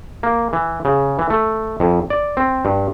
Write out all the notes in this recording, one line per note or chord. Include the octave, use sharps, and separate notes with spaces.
A#3
E3
C#3
E3
A3
F2
D5
C4
G2